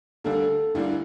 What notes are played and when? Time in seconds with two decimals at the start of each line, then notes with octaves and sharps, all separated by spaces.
0.24 D2 D3 G3 A#3 D4 A4
0.75 D2 D3 G3 A#3 D4 E4